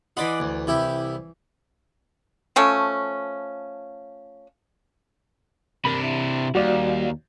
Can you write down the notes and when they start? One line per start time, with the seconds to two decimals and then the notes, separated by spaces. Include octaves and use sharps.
0.17 E3 D5 D#5 F#5 B5 C6
0.40 D2
0.67 C2 E4 G4
2.56 F3 A3 C#4
5.85 C3 D4 A#4 B5
6.03 E4
6.55 D#2 G3 F#4 D5 F5